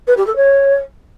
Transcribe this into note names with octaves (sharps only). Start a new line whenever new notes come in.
B4
G4
A4
C#5